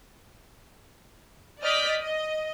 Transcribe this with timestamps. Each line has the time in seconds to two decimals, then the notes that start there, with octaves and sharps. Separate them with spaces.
1.62 D5 D#5 D#6 F6 G6 B6
2.01 D#5